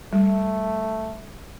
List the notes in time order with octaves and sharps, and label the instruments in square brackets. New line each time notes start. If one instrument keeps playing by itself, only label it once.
[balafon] G3 [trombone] A3